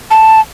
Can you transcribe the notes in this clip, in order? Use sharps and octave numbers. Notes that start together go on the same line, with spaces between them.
A5